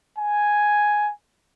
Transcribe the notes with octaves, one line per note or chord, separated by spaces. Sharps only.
G#5